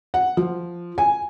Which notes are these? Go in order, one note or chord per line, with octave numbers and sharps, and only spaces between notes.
F#5
F3
G#5